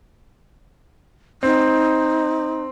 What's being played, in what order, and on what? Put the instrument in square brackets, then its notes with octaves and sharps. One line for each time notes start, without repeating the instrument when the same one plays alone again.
[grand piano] C4 [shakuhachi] D#4